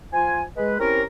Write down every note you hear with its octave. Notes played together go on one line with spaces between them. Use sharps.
F3 F4 G#5
G#3 B4
C4 C#4 E4 G4 A#4